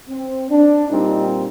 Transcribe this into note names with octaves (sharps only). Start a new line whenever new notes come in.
C4
D4
A#2 G3 C4 D#4